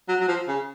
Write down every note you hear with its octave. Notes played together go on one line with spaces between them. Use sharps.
F#3
F#3
F3
C#3